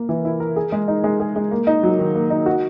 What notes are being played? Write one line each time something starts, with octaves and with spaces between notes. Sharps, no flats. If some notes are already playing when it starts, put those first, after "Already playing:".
Already playing: A#3 A#4
E3
E4
A#4
G#4
G#3
D#4
G#3
G#4
G#3
A#3
D#4
F#3
D#3
A#3
D#4
F#4